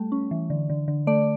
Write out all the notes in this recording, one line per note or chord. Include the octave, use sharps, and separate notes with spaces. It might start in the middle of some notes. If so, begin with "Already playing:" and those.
Already playing: G3 A3
C#4
E3
D3
D3
D3
A3 D5